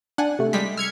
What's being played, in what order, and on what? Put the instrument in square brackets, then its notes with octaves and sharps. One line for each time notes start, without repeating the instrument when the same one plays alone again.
[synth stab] D4 [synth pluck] F#5 G#5
[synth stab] C3 A3
[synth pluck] G3 G#3 [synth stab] B6
[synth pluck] E6 [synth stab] F6 G#6 C#7